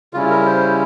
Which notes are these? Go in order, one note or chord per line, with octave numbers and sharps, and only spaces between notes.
C#3 G3 C#4 E4 F4
A#4
C5